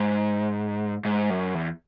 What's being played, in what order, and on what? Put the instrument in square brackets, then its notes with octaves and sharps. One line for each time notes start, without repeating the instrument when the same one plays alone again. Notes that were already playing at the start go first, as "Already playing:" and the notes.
Already playing: [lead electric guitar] G#2
G#2
F#2
E2